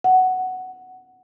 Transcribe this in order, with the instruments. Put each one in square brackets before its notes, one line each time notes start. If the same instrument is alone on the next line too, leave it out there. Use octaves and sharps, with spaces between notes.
[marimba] F#5